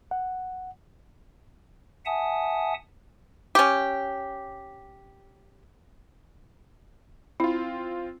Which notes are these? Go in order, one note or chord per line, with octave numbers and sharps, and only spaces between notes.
F#5
E5 F#5 G#5 A5 D#6
C#4 G4
C4 E4 F4